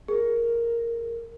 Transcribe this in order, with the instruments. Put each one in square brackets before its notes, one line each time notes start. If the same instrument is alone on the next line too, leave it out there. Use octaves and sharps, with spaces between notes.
[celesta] G#4 [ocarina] A#4